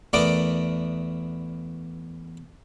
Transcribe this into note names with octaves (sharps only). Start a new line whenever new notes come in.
E2 A3 B3 A#4 D5 D6